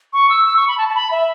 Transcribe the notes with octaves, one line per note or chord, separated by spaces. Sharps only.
C#6
E6
E6
C#6
B5
A5
A5
B5
E5